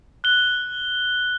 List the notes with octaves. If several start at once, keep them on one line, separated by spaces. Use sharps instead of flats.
F#6 G7